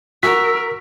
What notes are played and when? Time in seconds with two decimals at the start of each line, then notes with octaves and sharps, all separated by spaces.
0.23 F#4 A#4 E6 B6